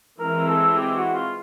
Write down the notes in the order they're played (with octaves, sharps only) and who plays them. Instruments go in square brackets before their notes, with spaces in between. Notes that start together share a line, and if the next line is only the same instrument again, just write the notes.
[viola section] E3 G#3 C4 [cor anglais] A#4
[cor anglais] A4
G4
F#4
F4